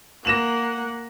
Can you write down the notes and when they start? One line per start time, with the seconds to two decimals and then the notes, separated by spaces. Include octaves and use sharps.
0.25 A#3 F#5 A#6 E7 F#7